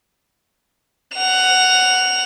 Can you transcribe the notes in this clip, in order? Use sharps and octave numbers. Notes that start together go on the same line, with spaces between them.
F#5 F7